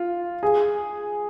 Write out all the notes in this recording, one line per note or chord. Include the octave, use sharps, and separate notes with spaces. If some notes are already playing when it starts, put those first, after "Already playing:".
Already playing: F4
G#4